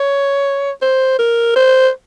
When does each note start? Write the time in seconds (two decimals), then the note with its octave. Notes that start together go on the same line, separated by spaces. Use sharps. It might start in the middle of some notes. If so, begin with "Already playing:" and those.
Already playing: C#5
0.82 C5
1.19 A#4
1.56 C5